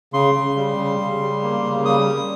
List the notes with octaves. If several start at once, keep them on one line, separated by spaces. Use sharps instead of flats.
C#3 C6
C#3
G3
C#3
C#3
G3
A#3
C#3
G3 D#6
G3